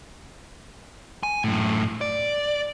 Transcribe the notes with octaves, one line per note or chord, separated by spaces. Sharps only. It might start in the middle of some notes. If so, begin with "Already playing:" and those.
G#5
F#2 A2
D5